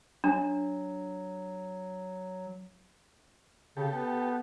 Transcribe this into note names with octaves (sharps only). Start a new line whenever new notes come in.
F#3 D4
C#3 G4 A4
B3